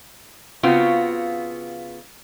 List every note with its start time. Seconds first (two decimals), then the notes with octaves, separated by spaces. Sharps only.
0.63 C#3 B3 C4 F4 F#4